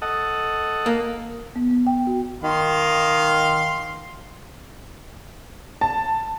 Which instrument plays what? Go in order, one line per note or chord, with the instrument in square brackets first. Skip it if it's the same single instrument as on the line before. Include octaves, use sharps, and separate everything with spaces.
[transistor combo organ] A4 D#5 F#5
[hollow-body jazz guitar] A#3
[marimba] B3
B3
G5
F#4
[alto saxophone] D#3 [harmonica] F5 C6
[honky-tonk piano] A5